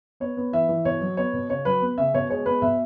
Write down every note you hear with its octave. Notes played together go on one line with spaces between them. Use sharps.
B3 C#5
B3
E3 E5
E3
B2 C#5
F#3
B3 C#5
B2
C#3 C#5
F#3 B4
B3
C#3 E5
B2 C#5
G#3 C#5
B3 B4
B2 E5